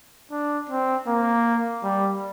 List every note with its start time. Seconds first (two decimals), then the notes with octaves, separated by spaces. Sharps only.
0.31 D4
0.69 C4
1.07 A#3
1.84 G3